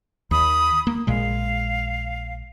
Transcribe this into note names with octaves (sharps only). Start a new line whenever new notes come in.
D#2 B5 D#6
A#3
A#1 A#2 G#3 F5